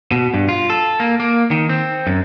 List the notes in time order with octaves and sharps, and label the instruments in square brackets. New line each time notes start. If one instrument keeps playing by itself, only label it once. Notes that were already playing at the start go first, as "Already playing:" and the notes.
[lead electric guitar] B2
G2
F4
A4
A#3
A#3
D#3
C4
F#2